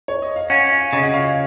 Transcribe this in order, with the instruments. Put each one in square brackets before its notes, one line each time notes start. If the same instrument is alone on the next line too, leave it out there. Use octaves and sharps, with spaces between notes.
[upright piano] C#5
D#5
F5
[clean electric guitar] C#4 [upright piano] F#5
[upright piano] F5
[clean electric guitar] C#3 [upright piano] D#5
[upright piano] F#5
F5